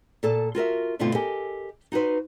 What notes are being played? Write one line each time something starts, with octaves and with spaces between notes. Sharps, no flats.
A#2 A4 A5
F4 F#4 A#4 E5
G2 B2 D3 A3 C4 F4
G4 A4 A#4 D#5 G#5
D#4 F#4 G4 B4 C5